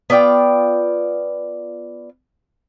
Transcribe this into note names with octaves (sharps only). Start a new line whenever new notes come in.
B3 F4 D5 G5